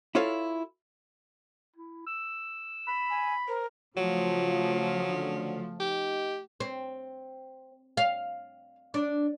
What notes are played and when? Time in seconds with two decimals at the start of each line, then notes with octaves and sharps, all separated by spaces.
0.15 E4 F4 A4 C#5 F5
1.76 E4
2.07 E6
2.88 B5
3.10 G#5
3.48 A#4 C5
3.97 C#3 F3 F#3 A3 F4
5.08 D3
5.80 D#4 G4 D#5
6.60 C4
7.97 F5
8.94 D4